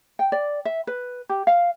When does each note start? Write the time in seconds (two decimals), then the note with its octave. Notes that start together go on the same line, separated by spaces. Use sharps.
0.19 G5
0.32 D5
0.65 E5
0.87 B4
1.29 G4
1.47 F5